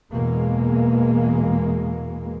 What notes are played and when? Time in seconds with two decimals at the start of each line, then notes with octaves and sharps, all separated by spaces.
0.12 E2 B2 E3 G#3 A#3